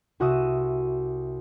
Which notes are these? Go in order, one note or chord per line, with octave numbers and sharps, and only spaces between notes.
C2 F#4 E5 D#6